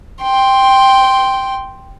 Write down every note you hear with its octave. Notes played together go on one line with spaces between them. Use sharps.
G5 C6